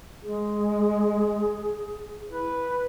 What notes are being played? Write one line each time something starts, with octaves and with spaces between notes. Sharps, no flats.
G#3 G#4
E4 B4